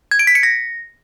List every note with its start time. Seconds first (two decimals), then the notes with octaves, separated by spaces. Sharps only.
0.11 G#6
0.19 D7
0.27 B6
0.35 C#7
0.43 A#6